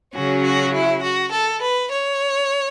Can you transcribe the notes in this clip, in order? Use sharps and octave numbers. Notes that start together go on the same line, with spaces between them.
C#3 F#3 C#4 F#4
F#4
E4
F#4
A4
B4
C#5